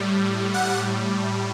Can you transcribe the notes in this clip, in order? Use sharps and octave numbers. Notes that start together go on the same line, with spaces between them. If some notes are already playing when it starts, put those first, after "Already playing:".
Already playing: A2 G3
F#5